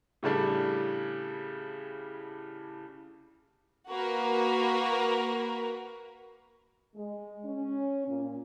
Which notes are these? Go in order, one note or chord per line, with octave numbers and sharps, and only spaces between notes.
A2 C#3 G3 D4
A#3 F#4 A#4 B4
G#3
C#4
A#2